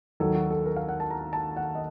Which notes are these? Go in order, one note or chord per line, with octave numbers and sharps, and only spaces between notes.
D#2 D#3 F#3 A4
F#4
A4
A#4
F5
F#5
A5
A#5
A5
F#5
D#5